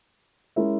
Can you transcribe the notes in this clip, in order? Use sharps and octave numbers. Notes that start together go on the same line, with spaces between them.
G#3 C#4 E4 A#4 E5